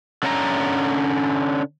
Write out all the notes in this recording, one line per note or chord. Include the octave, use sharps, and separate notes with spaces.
D3 C#4 F#5 A#5